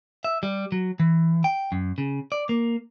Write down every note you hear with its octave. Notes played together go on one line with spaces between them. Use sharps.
E5
G3
F#3
E3
G5
F#2
C#3
D5
A#3